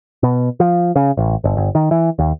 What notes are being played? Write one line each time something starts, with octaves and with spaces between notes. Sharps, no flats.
B2
F3
C#3
A1
G1
G1
D#3
E3
D#2